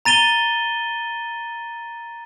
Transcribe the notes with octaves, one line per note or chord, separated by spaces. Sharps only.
A#5 A6 D#7 G7